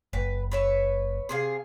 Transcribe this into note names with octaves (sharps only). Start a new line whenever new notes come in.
F#1 B4
B4 C#5 E5
C3 G#4 F5